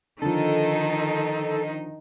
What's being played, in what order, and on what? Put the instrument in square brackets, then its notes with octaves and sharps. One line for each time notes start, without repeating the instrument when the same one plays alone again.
[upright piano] D3 F3 [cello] D#3 D#4 [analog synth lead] A4